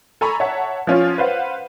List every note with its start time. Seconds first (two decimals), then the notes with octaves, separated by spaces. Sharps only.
0.21 A4 G#5 A#5 B5 C#6
0.40 C#5 E5 F#5 A5
0.87 F3 C#4 F4
1.18 B4 C5 F5 F#5